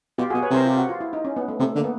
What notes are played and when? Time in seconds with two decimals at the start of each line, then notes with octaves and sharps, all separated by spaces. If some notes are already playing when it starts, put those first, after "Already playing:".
0.18 B2 F4 G4
0.30 B2 F#4 G#4
0.42 B4 C#5
0.50 C3 A#4 C5
0.65 F4 G4
0.77 F#4
0.89 F4
1.01 E4
1.13 D#4
1.25 C#4
1.36 B3
1.48 A3
1.60 C3 A3
1.76 D3 A#3
1.84 B3